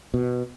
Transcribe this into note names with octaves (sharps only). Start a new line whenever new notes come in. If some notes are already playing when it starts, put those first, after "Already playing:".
B2